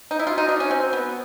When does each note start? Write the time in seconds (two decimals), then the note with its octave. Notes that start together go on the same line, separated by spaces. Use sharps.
0.11 D#4
0.19 E4
0.26 F4 F#4
0.38 D#4
0.48 D4
0.60 C#4
0.71 C4
0.93 B3